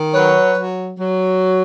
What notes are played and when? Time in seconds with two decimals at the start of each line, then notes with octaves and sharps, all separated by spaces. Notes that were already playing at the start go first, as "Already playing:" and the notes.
Already playing: D#3
0.13 F#3 B4 C#5
0.56 F#3
1.00 F#3